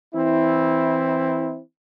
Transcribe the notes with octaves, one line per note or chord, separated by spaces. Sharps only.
E3 C4 E4